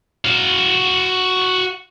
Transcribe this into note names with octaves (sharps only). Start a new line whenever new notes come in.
F#4 F5